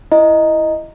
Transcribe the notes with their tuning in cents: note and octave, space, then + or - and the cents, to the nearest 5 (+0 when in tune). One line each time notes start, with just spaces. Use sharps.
E4 +10 D#5 +0 A#5 +0